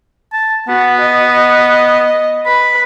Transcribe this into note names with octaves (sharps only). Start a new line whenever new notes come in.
A5
B3 F#4
D#5
B4 B5